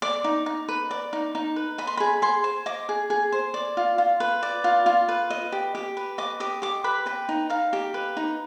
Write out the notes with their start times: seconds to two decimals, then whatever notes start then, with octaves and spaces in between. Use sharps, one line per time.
0.02 D5 D6
0.24 D#4
0.46 D#4
0.68 B4
0.91 D5
1.13 D#4
1.35 D#4
1.56 B4
1.78 D#5 B5
1.87 C6
1.97 G#4 B5
2.22 G#4 C6
2.44 C5
2.66 D#5 D6
2.89 G#4
3.10 G#4
3.32 C5
3.54 D5
3.77 F4
3.98 F4
4.20 B4
4.43 D5
4.64 F4
4.86 F4
5.08 B4
5.30 D#5
5.52 G4
5.75 G4
5.97 B4
6.18 D#5 D6
6.40 G4 D#6
6.62 G4 D6
6.84 B4 B5
7.06 B4 G5
7.29 D#4
7.50 D#4 F5
7.73 G4
7.94 B4
8.17 D#4